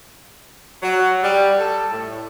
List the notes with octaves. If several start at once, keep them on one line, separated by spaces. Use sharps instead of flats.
F#3
G3
A4
A2